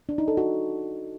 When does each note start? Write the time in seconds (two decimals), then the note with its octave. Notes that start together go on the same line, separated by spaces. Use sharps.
0.09 D4
0.18 D#4
0.28 A4
0.37 F#4